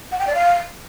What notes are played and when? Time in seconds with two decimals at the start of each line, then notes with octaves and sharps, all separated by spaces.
0.11 F#5
0.19 G5
0.27 D5
0.34 F5